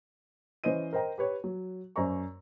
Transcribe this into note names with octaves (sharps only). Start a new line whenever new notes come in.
E3 C#4 C5 D#5 D#7
A#4 C5 D#5 G5 A#5
G4 B4 C#5
F#3
F#2 C5 D5 A#5 C#6